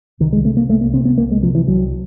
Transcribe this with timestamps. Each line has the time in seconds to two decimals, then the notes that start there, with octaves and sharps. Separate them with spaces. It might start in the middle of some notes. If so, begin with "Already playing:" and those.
0.20 C2 D#3
0.33 G#3
0.44 C3 A3
0.57 A#3
0.69 C2 A3
0.81 A#3
0.93 C3 C4
1.05 B3
1.18 C2 A#3
1.31 G#3
1.42 C3 F3
1.55 E3
1.67 C2 F#3